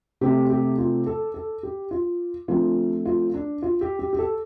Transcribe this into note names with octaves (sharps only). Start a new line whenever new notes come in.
C3 A3 C4 G4
G4
F4
A4
A4
G4
F4
D3 F3 A3 C4 F4
F4
D4
F4
G4
G4
G4
A4